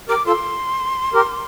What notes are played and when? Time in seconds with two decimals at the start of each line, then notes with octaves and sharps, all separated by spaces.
0.09 G4 A#4 D6
0.26 F4 A4 C6
1.14 G4 A#4